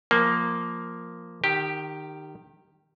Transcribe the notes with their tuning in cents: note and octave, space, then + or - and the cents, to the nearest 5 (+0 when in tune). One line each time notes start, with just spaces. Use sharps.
F3 +0 A#3 +0
D#3 -20 G4 +0